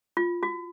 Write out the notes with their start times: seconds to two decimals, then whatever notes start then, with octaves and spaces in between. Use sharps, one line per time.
0.17 F4
0.43 F#4